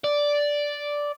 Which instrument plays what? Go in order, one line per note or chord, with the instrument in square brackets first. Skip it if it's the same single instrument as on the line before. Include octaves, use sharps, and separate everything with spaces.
[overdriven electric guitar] D5